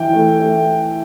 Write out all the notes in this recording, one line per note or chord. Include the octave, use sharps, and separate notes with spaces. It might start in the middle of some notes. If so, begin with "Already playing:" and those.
Already playing: E3 G5
A3
A3